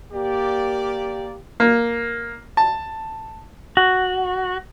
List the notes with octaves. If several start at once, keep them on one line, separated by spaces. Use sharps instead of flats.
A#3 G4 D5
A#3
A5
F#4